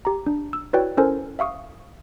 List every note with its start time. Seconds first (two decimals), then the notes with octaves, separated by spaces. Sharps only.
0.05 G4 A#5
0.26 D4
0.53 E6
0.73 E4 F#4 B4 C#5 D5 G5
0.97 C#4 E4 A4 A#4 C5 G#5
1.39 E5 F5 C#6 D#6